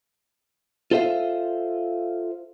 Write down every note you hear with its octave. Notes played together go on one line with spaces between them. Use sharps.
F4 A4 C5 E5 F5